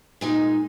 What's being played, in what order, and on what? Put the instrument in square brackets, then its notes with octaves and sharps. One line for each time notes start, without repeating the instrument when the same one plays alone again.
[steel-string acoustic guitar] A#2 G#3 D#4